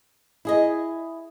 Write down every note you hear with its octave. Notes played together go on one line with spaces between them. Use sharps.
E4 G#4 D#5